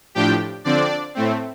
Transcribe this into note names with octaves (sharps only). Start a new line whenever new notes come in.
A2 F3 D4 G4 G5
D3 F3 C4 D4 D5
A2 A3 C4